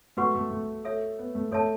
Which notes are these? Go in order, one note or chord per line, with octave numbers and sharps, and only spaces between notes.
A3 F#4 B4 F#5 C#6
A3
A3
A4 C#5 E5
B3
A3
A3 A4 C#5 E5 A5